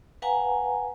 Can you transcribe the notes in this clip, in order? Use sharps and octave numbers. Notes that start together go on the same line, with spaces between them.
B4 F5 F#5 G#5 A#5